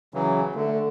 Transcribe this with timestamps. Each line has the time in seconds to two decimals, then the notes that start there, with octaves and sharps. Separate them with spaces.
0.14 C#3 E3 F#3
0.55 D3 A3